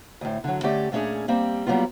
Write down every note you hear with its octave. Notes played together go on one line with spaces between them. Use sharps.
D2 A2
D3 F#3
D3 A3 C#4 G4 D5
A#2 A3 C#4 D4 G#4
G3 A#3 C4
F#3 G3 A#3 B3 F4